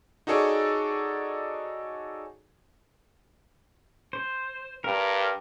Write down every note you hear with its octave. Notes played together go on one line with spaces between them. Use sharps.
D#4 F#4 G#4 A4 C#5 D5
C5
G2 A#4